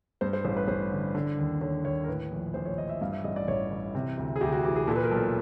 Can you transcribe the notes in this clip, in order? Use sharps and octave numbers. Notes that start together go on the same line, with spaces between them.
G2 C5
C5
A1 C5
B4
A1 C5
D3
D3
D#2
D3 C#5
D#2 C#5
A#4
A2 B4
A#1
A#1 C5
C#5
E3 D#5
E5
G2 F5
E5
A1 D#5
D5
A1 C#5
E3
C3
D2
G#4
D2 G4
F#4
E3 G4
G#4
A#2 A4
B4
A#4
B1 A4